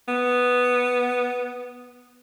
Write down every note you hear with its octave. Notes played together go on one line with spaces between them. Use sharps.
B3